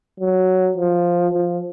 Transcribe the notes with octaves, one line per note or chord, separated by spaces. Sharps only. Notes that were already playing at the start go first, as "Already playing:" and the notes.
F#3
F3
F3